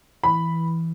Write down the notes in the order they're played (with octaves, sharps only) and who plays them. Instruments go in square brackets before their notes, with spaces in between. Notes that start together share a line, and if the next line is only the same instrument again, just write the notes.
[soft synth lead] E3 [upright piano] B5